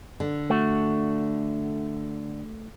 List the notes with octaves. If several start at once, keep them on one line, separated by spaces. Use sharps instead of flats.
D3
A3 F#4